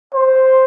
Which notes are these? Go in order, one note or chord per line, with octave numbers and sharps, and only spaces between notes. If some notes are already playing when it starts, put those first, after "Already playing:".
C5